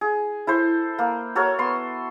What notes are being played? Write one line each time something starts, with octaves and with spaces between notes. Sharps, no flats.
G#4
E4 A4 C5
A#3
F#4 A4 A#4 C#5
B3 C6